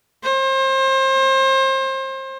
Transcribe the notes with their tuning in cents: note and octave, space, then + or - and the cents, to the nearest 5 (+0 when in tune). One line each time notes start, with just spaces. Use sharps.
C5 +30